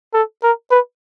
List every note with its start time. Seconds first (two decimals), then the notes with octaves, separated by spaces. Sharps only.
0.14 A4
0.43 A#4
0.71 B4